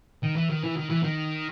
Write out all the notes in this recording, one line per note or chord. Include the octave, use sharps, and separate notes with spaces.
D#3
E3
D#3
E3
D#3
E3
D#3